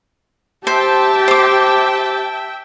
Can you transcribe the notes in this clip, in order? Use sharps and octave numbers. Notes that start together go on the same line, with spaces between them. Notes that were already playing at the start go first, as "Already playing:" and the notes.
G4 C5 E5 G5 A5
C5 D6